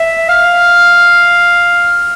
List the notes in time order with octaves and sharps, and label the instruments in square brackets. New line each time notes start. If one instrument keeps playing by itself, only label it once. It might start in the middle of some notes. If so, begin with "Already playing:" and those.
Already playing: [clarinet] E5
F5